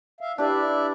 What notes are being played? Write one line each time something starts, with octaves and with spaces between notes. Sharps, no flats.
E5 F5
D4 E4 G4 B4 D5 E5